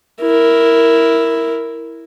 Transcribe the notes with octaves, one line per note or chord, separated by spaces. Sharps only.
E4 A#4